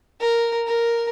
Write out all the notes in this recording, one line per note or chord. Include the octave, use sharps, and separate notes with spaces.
A#4
A#4